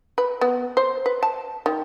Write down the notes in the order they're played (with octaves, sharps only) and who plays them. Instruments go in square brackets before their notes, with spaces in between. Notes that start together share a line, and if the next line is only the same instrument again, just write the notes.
[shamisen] B4
B3
C5
B4
A5
D#3